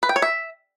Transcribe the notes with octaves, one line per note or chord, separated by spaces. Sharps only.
B4
G5
C#5
E5